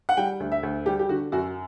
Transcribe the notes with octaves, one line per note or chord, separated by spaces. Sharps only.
F#5
G3 G5
D2
E5
D2
G3 G4
G4
D3 F#4
F#2 F#4